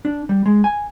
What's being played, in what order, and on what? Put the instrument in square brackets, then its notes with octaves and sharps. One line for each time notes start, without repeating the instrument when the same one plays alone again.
[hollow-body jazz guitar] D4
G3
G#3
G#5